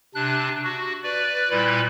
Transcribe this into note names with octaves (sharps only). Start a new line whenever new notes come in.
C3 D4 F#6
F#4
B4 D5
A#2 G3 E4 B4 B5